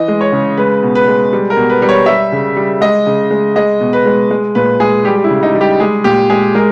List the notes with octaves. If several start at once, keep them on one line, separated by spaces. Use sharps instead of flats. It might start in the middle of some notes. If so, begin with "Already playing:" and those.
Already playing: E3 D#5
G#3
C#5
C#3
G#3 B4
B2
B4
G#3
G3
A#4
B2
B4
G3
C#5
G3 E5
C#3
G3
G#3 D#5
C#3
G#3
G#3 D#5
B2
B4
G#3
G#3
A#2 B4
G#3 G#4
G3 G4
G4
E4
C#3
D#4
G3
G4
G#3 G#4
A#2 G4
G#3 G#4
G#3 A#4